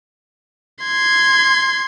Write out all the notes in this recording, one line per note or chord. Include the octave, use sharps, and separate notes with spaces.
C6 G#6